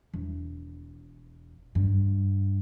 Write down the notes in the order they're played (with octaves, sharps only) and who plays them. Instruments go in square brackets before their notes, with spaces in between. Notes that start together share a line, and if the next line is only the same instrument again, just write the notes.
[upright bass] E1
G2